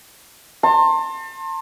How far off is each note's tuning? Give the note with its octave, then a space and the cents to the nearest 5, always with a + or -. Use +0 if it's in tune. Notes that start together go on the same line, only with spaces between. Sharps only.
A5 +40 C6 +30